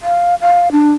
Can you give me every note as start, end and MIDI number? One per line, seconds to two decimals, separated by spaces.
0.02 0.35 77
0.41 0.71 77
0.72 0.92 62